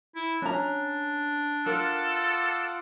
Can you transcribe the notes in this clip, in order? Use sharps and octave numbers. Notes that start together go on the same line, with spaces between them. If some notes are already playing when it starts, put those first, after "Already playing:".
E4
C#4 D4 A#5
F4 A4 A#4 F#5 D6